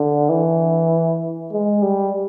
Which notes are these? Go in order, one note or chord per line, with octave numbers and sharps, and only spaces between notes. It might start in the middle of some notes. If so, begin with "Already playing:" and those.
Already playing: D3
E3
G#3
G3